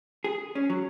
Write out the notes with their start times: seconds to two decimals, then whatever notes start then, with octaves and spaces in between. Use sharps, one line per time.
0.24 G#4
0.55 C#4
0.70 F#3